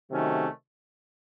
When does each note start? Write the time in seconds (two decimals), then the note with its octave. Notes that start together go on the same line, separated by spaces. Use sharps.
0.11 C3 D#3 F#3 A3 C#4